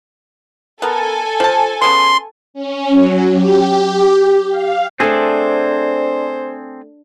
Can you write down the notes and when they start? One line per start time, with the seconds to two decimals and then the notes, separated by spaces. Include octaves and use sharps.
0.82 B3 A4 A#4 G#5
1.40 F3 A5
1.82 C#3 B3 C6
2.54 C#4
2.91 F#3
3.33 G4
4.51 F5
5.00 A3 C4 D4 G#4 A4 C5 D5